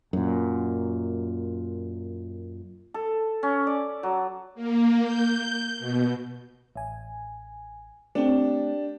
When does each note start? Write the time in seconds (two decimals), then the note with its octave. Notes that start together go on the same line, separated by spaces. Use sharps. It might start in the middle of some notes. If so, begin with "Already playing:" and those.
0.13 F#2 A#2
2.94 A4
3.43 C#4
3.67 D5
4.03 F#3
4.55 A#3
5.03 G6
5.79 B2
6.76 A1 G#5
8.15 A3 C4 D4 G4